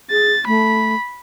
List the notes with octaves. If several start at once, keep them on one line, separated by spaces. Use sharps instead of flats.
G#4 A6
A3 B5